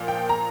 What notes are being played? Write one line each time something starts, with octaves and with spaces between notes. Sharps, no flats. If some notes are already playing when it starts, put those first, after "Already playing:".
Already playing: A#2 F3 A#3
G5
A#5